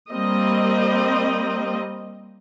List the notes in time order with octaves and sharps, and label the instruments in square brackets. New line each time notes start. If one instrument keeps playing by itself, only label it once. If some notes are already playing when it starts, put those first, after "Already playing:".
[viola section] G3 A#3 C4 D#5